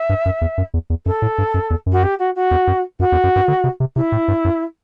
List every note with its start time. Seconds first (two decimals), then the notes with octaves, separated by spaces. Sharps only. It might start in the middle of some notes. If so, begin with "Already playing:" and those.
Already playing: E5
0.09 G2
0.25 F#2
0.41 E2
0.58 F#2
0.74 E2
0.90 E2
1.06 F#2 A4
1.22 A2
1.38 G2
1.54 F#2
1.70 E2
1.86 F#2
1.92 F#4
2.03 G4
2.19 F#4
2.35 F#4
2.51 E2
2.67 F#2
2.99 F#2 F#4
3.12 E2
3.24 F#2
3.36 G2
3.48 D3
3.64 C3
3.80 C3
3.96 C3 E4
4.12 A2
4.28 G2
4.45 F#2